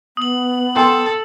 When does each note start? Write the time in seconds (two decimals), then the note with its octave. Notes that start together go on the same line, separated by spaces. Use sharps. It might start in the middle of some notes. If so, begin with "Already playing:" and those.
0.17 B3 D#6 F#7
0.76 A4 G5 C6